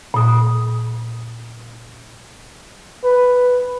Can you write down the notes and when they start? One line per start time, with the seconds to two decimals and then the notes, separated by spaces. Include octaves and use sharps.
0.14 A#2 D#6
3.04 B4